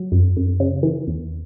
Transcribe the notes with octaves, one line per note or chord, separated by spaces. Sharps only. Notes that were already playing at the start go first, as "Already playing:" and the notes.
Already playing: F#3
F#2
F#2
C#3
E3
E2